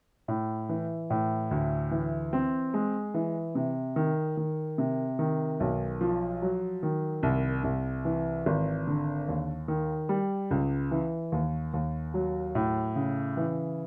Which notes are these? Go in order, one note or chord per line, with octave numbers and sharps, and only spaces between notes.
A2
E3
A2
D2
E3
C4
G#3
E3
C3
D#3
D#3
C3
D#3
B1
F3
F#3
D#3
C2
C2
E3
G#1
D3
D#2
D#3
G3
C#2
E3
D#2
D#2
F#3
A2
C#3
E3